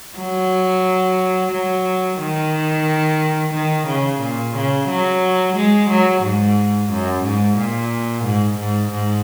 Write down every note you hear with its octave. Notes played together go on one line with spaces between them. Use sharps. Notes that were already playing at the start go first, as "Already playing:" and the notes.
F#3
F#3
D#3
D#3
C#3
A#2
C#3
F#3
G#3
F#3
G#2
F#2
G#2
A#2
G#2
G#2
G#2